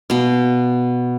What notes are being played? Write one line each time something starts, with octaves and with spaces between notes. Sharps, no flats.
B2 F5